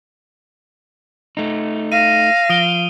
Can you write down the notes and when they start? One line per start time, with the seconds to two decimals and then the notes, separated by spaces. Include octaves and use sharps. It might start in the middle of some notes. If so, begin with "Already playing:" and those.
1.37 A3 D#4
1.92 F5 A#6 D#7
2.50 F3 D#6 D7 G7